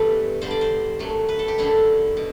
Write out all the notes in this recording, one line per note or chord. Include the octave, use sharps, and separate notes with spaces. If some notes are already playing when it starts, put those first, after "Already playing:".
Already playing: E2 G2 E3 A3 G4 A4 B4
G2 D3 G3 C5
D5
C5
F#2 F#3 A3
B4
A4
G4
F#2 D3 A3 E4
B2